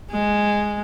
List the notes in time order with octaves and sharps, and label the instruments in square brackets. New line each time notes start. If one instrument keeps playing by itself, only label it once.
[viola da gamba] G#3